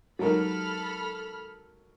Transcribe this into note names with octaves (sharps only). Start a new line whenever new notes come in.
F#3 G#3 D#4 G4 A4 A#4 B5 F6